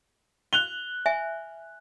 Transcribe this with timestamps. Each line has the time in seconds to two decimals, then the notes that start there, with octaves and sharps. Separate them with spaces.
0.53 F#6 F7 G7
1.06 E5 G#5